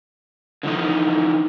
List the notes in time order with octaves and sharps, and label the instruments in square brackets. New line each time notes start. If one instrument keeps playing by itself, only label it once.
[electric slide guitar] D3 E3 F3 D#4